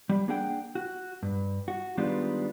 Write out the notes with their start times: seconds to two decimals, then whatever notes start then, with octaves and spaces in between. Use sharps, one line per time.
0.09 G3
0.28 A#3 D4 G#4 F#5 G5
0.75 F#4
1.23 G2
1.68 F#4
1.97 D#3 G3 G#3 B3 D4 F4